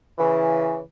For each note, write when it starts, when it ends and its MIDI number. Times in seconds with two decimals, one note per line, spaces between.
0.18 0.78 49
0.18 0.78 52